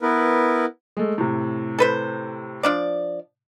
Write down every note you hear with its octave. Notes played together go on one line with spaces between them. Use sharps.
B3 E4 A#4 B4
G#3 A3
A2 C3
A4 B4 C5
F3 D4 D5